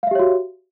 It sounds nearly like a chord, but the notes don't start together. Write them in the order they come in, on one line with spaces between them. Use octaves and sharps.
F5 E5 G4 C#5 F#4